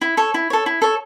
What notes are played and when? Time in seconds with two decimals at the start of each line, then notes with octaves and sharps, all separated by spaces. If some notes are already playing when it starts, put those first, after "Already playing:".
0.01 E4
0.17 A4 C#5
0.34 E4
0.50 A4 C#5
0.66 E4
0.82 A4 C#5